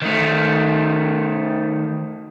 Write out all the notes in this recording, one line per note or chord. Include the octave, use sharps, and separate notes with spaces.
D#3 A3